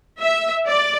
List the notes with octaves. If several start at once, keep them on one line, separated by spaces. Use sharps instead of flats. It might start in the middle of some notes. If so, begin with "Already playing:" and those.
E5
D5